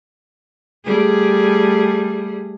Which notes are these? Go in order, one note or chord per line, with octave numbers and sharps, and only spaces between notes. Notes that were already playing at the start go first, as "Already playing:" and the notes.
G3 A3 G#4